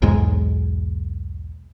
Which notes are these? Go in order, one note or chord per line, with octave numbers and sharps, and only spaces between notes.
B1 E2 G#2 G#3